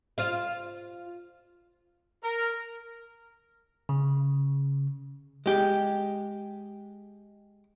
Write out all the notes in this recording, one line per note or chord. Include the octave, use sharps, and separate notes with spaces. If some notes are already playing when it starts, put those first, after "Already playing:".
F4 C5 F5
A#4
C#3
G#3 G4